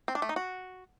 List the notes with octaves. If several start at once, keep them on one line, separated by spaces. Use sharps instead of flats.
C4
D4
A3
D#4
F#4